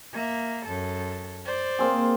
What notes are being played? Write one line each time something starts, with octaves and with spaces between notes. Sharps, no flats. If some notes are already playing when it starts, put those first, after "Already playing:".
A#3 E5
F#2 A4
C5 D5
A#3 C4 G#4